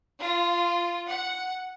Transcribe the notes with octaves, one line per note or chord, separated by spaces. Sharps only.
F4
F#5